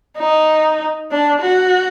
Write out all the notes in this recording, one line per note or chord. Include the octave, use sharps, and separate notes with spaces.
D#4
D4
F#4